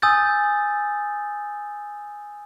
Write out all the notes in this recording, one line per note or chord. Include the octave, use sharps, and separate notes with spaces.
G#5 D#6 E6 G6 A6